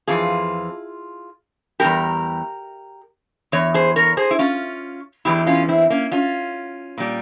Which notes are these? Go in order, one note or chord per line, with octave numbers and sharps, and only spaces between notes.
F2 C3 E3 F4 G#4
E2 C3 G3 G4 A#4
E2 E3 C#5
G#4 C5
A#4 C#5
G#4 C5
E4
C#4 F4
E2 E3 G#3 E4 G4
C#4 F4
C4 E4
A#3 C#4
C#4 F4
A#2 G3